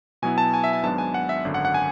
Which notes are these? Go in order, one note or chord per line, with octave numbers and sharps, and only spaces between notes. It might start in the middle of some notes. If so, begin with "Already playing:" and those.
B2 F#3 B3 E4 G#5
A5
G#5
E5
G#5
G#1 G#2 F#3 B3 D4 A5
G#5
F#5
E5
G#1 F#2 D3
F#5
F#5
G#5